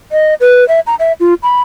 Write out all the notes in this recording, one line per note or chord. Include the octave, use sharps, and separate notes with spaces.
D#5
B4
E5
A#5
E5
F4
B5